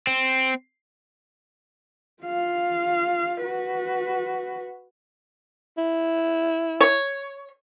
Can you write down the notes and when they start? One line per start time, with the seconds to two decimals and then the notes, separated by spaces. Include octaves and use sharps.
0.07 C4
2.23 F4 F5
3.43 F#4 B4
5.78 E4
6.80 C#5